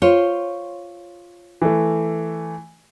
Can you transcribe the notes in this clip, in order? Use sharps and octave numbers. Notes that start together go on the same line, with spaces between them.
F4 C5 C#5
E3 A3